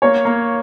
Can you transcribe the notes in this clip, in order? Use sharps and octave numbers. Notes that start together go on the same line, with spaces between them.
A#3 C#5
A#3